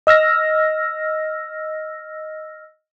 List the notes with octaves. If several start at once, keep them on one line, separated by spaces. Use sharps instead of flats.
D#5 E6 F6 A#6